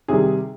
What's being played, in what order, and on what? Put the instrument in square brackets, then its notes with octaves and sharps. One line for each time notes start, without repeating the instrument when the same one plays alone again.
[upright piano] C3 D#3 G3 G#4